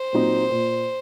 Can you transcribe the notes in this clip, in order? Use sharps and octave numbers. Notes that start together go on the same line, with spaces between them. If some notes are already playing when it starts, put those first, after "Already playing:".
Already playing: C5
A#2 F#3 C4 D#4
A#2